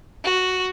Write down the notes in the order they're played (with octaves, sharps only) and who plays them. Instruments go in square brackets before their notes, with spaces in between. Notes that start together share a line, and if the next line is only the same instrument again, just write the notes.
[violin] F#4